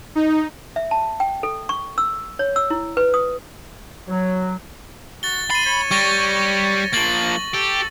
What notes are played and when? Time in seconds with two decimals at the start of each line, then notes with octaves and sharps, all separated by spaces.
0.15 D#4
0.76 E5
0.91 A5
1.20 G5
1.43 A4
1.69 C#6
1.98 E6
2.39 C#5
2.56 E6
2.70 E4
2.97 B4
3.14 D#6
4.08 F#3
5.23 F#4 A6 G7
5.50 B5 C6 A6 D#7
5.66 C#5
5.91 G3 C#6 A6 A#6
6.93 F3 A#3 A6 F#7
7.54 G4 A4